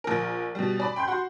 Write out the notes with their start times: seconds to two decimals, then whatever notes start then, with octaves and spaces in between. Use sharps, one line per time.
0.04 A#1 A#4
0.55 B2 G3
0.79 D5 B5
0.96 G5 B5 C6 G6
1.08 F#4 C6